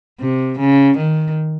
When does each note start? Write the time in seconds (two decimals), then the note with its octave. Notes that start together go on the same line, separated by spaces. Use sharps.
0.20 C3
0.59 C#3
0.97 D#3